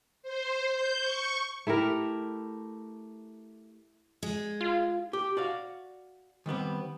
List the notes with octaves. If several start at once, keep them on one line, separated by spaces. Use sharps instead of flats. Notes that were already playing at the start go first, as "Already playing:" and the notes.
C5
G6
C#6
A3 E4 G4 A#4
G#3
F4
G4
F#4 D5 F5
D#3 G3 B3 C4